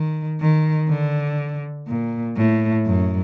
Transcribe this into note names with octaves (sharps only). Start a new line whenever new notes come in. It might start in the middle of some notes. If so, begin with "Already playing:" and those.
Already playing: D#3
D#3
D3
A#2
A2
F#2